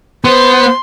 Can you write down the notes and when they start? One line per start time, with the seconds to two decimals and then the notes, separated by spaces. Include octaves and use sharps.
0.24 B3 C5 C6